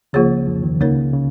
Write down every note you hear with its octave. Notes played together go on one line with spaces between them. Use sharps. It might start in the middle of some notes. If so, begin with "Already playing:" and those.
C#2 C#3 F3 A#3 F4 G#4 C#5
F2 F3
D#2 D#3
C#2 C#3 A#3 D#4 A#4 C#5
C#3